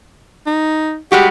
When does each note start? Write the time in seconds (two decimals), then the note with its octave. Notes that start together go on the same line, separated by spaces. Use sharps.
0.46 D#4
1.12 G3 G#3 F#4 G4